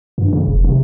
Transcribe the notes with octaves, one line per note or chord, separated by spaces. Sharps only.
G2
C#3
F1
C3